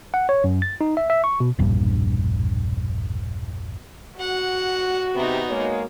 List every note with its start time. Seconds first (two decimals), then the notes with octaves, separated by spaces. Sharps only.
0.14 F#5
0.29 C#5
0.44 F#2
0.62 A6
0.81 D#4
0.97 E5
1.10 E5
1.24 C#6
1.40 B2
1.59 E1 A#1 G2
4.20 F#4 F#5
5.15 C3 B3 D#4
5.49 G#3 A#3 C#5